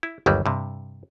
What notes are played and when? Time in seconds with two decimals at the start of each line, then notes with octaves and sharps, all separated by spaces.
0.03 E4
0.26 G1 D#2 F#3 G3
0.46 G2 C3